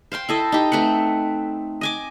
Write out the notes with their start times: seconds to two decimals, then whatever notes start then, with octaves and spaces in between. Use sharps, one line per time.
0.12 C5 F5 G5 C6
0.29 E4 A4 D#5
0.52 D#4 G4
0.72 A3 C4 B4 F#5
1.81 D#5 G#5 D6